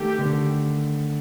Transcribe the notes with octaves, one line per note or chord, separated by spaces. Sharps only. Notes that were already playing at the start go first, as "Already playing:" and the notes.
Already playing: D#3 A3 G4
D3